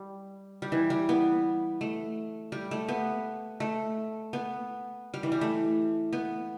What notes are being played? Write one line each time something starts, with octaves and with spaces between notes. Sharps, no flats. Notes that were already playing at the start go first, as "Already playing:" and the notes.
Already playing: G3
G3
E3
G3
B3
A3
G3
A3
B3
A3
B3
G3
E3
G3
A3
B3